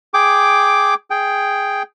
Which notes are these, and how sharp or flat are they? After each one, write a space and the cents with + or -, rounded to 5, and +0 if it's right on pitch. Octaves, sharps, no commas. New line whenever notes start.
G#4 +0 G5 +0 D6 +0
G#4 +0 G5 +0